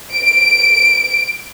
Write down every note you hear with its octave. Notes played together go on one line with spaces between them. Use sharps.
D7